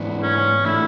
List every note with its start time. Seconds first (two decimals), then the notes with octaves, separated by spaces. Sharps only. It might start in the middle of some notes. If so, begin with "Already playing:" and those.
Already playing: G#2 E3 B3 D4
0.23 C#4
0.65 A2 E3 A3 D4 E4